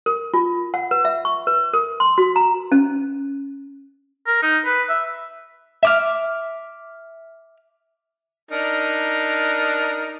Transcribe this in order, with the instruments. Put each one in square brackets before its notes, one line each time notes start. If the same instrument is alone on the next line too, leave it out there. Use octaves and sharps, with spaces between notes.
[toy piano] A#4
F4
F#5
B4
E5
C#6
B4
A#4
C6
F#4
A#5
C#4
[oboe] A#4
D#4
B4
E5
[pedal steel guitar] E5 D6 F6
[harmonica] D4 D#4 A#4